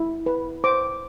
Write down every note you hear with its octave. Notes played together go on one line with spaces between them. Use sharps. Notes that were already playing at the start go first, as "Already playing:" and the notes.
Already playing: E4
B4
C5 D6